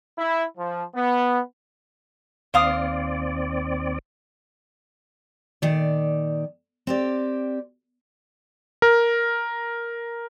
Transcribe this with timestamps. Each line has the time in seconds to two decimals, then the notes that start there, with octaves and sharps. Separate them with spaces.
0.18 E4
0.57 F3
0.95 B3
2.54 D#2 C4 C5 D5 F5 D#6
5.62 A#2 D#3 D5
6.87 C4 G4 D5
8.82 A#4